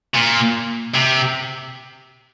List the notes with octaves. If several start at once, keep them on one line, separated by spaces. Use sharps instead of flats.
A#2
C3